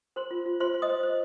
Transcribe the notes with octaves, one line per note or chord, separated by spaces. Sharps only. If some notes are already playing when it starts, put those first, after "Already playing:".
A#4 C5 C6
F4
F4
F4 C5 C6
C5
D#5 D#6
C5
C5